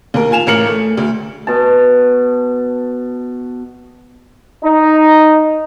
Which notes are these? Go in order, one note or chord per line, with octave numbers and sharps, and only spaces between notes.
D#2 A#4
F4 G#5 E7 F7
A1 A#4 F6 C#7 F#7
A3
D2
B2 A5
D#4